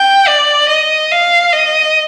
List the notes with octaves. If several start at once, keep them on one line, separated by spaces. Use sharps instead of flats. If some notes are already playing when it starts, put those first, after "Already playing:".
Already playing: G5
D5
D#5
F5
D#5